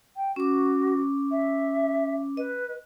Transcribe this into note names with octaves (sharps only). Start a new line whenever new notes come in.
G5
C#4 F#4 D6
E5
B4 D#5